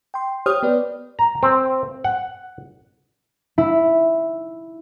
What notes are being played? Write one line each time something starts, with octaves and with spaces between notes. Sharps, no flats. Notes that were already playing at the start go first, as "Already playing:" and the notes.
G5 C6
G4 C5 C#5 G5 D#6 F6
B3 B4 D5
A#5
C4
F#5
E4